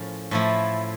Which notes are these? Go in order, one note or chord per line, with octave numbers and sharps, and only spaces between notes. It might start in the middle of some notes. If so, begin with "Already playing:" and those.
Already playing: A2 F3 A#3 C#4
A2 F3 A3 E4